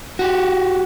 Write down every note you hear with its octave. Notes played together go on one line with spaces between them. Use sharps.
F#4 G4